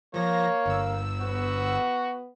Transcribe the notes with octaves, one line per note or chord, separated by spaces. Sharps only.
F3 A#3 C#5 A#6
G1 E6
B3 F#4